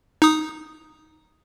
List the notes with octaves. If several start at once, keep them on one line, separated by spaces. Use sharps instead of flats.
D#4 D#6